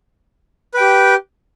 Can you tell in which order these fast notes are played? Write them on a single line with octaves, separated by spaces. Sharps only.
B4 G5 G4